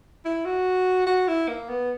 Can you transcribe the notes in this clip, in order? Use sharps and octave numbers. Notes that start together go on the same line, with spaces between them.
E4
F#4
F#4
E4
A#3
B3